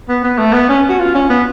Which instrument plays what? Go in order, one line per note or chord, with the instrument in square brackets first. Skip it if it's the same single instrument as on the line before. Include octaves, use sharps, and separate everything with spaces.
[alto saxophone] B3
B3
A3
B3
C#4
F#4
F4
C#4
B3